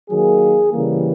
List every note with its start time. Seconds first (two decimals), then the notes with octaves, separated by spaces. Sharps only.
0.10 D#3 F#3 A#3 G#4
0.73 C#3 E3 G3 A#3